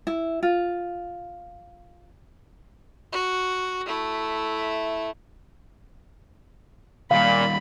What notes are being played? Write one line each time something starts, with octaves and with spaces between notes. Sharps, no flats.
E4
F4
F#4
A3 E4
A#2 D#3 G3 F5 B5